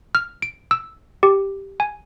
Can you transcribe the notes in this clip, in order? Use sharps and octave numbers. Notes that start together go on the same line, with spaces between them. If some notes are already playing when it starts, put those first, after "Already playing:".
F6
D7
E6
G4
G#5